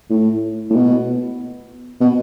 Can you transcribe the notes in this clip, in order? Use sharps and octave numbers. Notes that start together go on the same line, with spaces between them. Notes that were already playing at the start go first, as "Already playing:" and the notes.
A2
A2
B2
B2